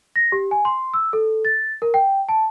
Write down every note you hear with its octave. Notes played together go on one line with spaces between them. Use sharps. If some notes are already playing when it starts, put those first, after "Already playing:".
A#6
G4
G#5
C6
E6
A4
A6
A#4
G5
A5